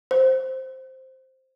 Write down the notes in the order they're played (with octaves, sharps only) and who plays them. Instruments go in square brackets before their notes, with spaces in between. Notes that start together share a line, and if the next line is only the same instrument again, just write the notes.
[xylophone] C5